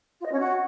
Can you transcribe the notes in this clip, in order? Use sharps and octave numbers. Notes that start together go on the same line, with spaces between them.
F4
D#5
C#4
F#4